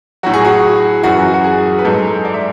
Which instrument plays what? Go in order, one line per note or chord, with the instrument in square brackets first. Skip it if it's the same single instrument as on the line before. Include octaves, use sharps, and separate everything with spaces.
[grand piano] A2 F#3 F#4
G#4
F#4
F#2 E3 F#4
F#4
G#4
B4
G#2 F#3 A4
D5
E5